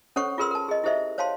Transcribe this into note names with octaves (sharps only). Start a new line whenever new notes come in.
C#4 A4 C5 C#5 F#5 C#6
F4 G#4 A#4 B4 C6 E6
A#4 A5
G#4 D#5
E4 G4 A4 C5 D#5 E5
C5 C#5 F5 A5 C6